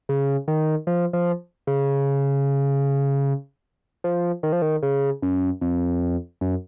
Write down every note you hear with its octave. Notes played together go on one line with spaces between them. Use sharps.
C#3
D#3
F3
F3
C#3
F3
D#3
F3
D#3
C#3
F#2
F2
F#2